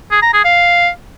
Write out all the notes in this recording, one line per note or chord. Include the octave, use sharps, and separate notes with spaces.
G#4
A#5
G#4
F5